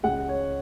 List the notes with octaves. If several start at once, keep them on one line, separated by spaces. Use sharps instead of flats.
C#2 C#3 G#3 F#5
C#5